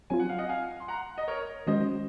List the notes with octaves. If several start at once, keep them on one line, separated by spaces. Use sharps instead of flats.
F#3 C4 F4 G#5
F#5
F5
D#5 F#5
F5 G#5
C6
F#5 A#5
D#5
A#4 C#5
D#3 G#3 C#4 F#4 C5 D#5